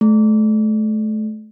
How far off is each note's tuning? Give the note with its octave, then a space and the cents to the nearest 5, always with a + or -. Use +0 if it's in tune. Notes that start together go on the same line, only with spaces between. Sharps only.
A3 -30